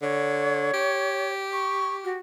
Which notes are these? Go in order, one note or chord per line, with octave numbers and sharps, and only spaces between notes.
D3 C#5
G4
C#6
F#4